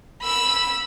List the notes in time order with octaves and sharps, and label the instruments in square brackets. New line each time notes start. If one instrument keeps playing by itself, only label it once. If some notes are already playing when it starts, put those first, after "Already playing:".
[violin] B5 E6